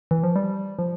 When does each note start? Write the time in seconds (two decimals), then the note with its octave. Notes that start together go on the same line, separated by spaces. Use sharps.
0.11 E3
0.23 F3
0.36 G3
0.79 F3